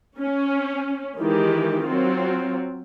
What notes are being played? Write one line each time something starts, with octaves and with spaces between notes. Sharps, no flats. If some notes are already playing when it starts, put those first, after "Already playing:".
C#4
D#3 E3 G#3 G4
F#3 C4 F4